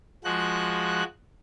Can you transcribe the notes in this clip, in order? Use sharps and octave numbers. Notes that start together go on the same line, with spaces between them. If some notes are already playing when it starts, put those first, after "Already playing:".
F3 G#3 F#4 F#6